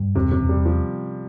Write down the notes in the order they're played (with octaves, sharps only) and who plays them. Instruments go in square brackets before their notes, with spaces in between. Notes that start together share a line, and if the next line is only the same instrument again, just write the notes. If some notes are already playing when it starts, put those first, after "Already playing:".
Already playing: [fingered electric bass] G2
[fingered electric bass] E1 [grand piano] C3
[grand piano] C3
[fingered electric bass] E2
[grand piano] G3
F3